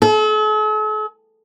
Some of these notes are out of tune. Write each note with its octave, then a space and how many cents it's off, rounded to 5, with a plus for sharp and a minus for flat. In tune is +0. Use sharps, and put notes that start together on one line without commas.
A4 -45